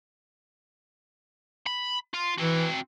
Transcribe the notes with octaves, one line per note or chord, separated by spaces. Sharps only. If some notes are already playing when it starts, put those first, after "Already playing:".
B5
F4
E3 C4 F#4